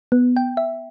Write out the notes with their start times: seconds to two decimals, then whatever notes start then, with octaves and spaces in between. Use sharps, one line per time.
0.12 B3
0.36 G5
0.57 E5